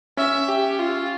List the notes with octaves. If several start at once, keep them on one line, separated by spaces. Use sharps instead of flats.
C#4 E5
G4
F4